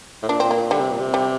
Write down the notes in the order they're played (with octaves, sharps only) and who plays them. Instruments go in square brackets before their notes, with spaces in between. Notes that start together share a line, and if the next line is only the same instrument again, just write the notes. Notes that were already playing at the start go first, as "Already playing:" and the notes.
[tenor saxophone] A2
[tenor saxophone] A#2 [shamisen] D4
[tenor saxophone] A#2 [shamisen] C4
[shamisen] A#3
[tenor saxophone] A#2
[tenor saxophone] D3 [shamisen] G3
[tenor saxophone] C3
A#2
C3
[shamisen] G3